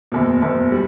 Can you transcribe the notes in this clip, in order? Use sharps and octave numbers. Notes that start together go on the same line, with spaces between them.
F#1 E2 B2
F#1 E2 B2
G3